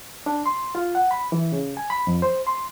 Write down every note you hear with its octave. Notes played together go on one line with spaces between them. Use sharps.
D4
C6
F4
F#5
B5
E3
C#3
G#5
B5
F2
C5
C6